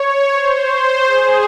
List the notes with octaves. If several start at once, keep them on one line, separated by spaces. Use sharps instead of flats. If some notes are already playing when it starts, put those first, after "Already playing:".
Already playing: C#5
C5
G#4